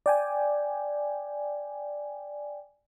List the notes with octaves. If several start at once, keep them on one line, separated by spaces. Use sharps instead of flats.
D5 G5 G#5